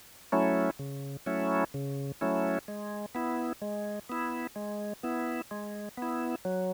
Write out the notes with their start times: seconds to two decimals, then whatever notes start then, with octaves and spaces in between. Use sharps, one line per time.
0.32 F#3 A3 C#4 E4
0.79 C#3
1.26 F#3 A3 C#4 E4
1.74 C#3
2.21 F#3 A3 C#4 E4
2.68 G#3
3.15 B3 E4
3.62 G#3
4.09 B3 E4
4.56 G#3
5.03 B3 E4
5.51 G#3
5.97 B3 E4
6.45 F#3